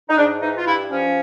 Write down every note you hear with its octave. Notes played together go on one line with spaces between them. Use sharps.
D#4
G#2 D4
E3 D#4
F4
G2 E4
F3 C#4